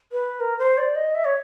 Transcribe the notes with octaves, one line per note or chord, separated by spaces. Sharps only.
B4
A#4
C5
D5
D#5
E5
C#5